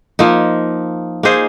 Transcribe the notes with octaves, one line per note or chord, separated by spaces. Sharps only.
F3 A#3 D#4
A#3 D#4 G#4 C5